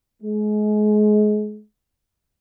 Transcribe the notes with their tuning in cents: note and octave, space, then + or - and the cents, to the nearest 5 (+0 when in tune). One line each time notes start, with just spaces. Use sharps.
G#3 +30